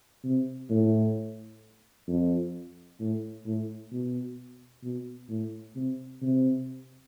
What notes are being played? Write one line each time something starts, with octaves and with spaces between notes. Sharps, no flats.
C3
A2
F2
A2
A2
B2
B2
A2
C3
C3